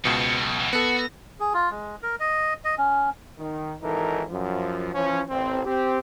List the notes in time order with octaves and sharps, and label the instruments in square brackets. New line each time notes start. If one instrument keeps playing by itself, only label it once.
[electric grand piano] C#2 B2 [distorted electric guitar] B3 C4
[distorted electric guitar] B1
E3 F#3
[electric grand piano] B3 A4 [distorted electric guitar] F#4
[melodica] G#4
F4
G#3
A#4
D#5
D#5
C#4
[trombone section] D#3
G#1 E3 D#4 A4 A#4
F#2 F3
E3 F3 C#4
A1 C4
C4 G4